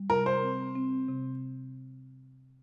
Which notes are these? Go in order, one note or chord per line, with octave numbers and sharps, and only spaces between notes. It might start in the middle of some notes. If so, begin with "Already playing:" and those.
Already playing: G3
C3 A#4
C5
C4
C4
C3